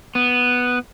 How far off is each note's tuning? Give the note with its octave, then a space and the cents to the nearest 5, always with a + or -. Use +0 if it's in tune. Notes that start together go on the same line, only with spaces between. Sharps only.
B3 +0